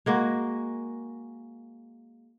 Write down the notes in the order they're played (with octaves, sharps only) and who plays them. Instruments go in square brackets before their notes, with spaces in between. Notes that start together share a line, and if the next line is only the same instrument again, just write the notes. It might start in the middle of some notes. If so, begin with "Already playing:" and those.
[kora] G#3 A#3 F#4